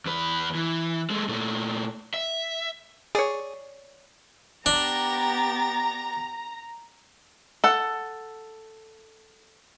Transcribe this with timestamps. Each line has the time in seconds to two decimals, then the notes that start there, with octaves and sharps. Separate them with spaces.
0.06 E2 B4
0.55 E3
1.10 G#3 A3
1.28 A#2 A3
2.14 E5
3.15 G#4 C#5 D5
4.66 B3 D4 G4 A#5 A6
7.64 A4 F#5